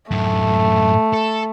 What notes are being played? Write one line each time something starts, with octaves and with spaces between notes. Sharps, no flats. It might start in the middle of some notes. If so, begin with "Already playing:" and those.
F#2 A2 A3
A4